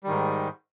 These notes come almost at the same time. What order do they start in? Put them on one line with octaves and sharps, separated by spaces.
G3 D#3 G#2